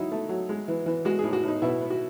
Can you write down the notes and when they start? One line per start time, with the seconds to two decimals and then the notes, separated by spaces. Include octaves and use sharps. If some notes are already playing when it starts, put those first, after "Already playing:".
Already playing: F#3 D#4 E4
0.11 A3
0.29 F#3
0.49 G#3
0.68 E3
0.86 E3
1.05 G#3 F#4
1.19 A2 G#4
1.33 F#4
1.43 A2 D#4
1.62 B2 E4
1.81 B3
1.90 F#4